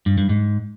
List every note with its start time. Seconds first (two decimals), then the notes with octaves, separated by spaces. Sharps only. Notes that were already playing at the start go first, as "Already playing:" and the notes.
0.06 G2
0.18 G2
0.29 G#2